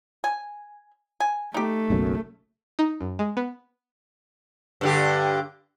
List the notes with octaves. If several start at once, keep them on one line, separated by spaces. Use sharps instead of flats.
G#5
G#5
A3 D#4 G4
F#1 B1 F#2
D#4
F#2
G#3
B3
G2 D3 G4